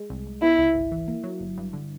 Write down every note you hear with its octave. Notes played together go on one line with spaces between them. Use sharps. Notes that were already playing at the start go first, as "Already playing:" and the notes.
Already playing: G#3
C2
C2
B3 E4
C#2
G#1
E3
A#3
F#3
G1
G2
D3